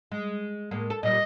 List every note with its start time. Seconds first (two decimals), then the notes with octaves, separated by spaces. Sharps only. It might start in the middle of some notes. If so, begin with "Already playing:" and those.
0.12 G#3
0.71 A2 G#3 A#3
0.90 A4
1.03 A#2 G3 D#5